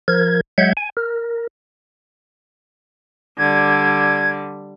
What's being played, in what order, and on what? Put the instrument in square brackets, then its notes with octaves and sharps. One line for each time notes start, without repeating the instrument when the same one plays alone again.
[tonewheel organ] F3 A#4 G#6
F#3 G#3 E5 F#5 G6 G#6
G#5
A#4
[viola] D3 G3 [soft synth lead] G#6